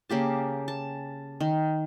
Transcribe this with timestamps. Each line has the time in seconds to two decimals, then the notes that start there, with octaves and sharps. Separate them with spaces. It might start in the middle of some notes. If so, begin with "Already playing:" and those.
0.10 C#3 A#3 G4 A5
0.68 A5
1.40 D#3